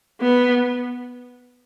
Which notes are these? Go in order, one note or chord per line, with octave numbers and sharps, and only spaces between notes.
B3